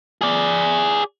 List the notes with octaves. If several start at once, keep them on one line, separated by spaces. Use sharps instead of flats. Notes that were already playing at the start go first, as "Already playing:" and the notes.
G#4 D5